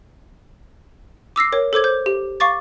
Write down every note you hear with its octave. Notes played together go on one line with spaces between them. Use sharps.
D6 E6 A#6 C7
A#4 C#5
A4 C5 D6 G#6
C5 G6
G4
F5 C#6 D6 A6